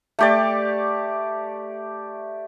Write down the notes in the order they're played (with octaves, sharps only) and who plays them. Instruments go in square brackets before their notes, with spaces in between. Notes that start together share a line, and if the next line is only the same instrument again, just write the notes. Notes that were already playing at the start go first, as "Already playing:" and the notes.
[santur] A3 G4 D5